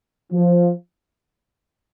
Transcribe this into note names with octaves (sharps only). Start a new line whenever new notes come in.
F3